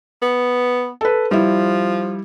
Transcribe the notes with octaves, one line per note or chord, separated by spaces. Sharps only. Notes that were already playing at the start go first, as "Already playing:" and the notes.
B3
A4 B4
F3 G3 E4